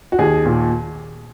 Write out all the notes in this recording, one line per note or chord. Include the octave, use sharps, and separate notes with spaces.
F#4
D#2 G#4
A#2